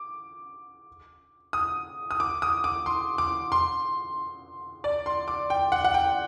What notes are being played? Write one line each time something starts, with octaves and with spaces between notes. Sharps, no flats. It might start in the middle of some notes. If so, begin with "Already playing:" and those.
Already playing: D6
D#6
D#6
D6
D#6
D6
C6
D6
C6
D5
C6
D6
G5
F#5
F#5
G5